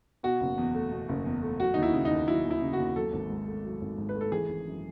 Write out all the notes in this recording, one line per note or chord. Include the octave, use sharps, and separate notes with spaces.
B2 F#4
F#1
E2
A3
B2
F#1
E2
A3
F#3 F#4
D#2 D#4
E4
C#3
D#4
D#2
F#3 E4
D#2
E4
C#3
F#4
D#2
F#3 A4
G#1
G#2
A3
F#3
G#1
G#2
B4
A3
A4
E3 G#4
G#1
F#2